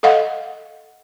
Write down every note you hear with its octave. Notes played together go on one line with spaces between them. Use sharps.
A4 D#5 F5 F#5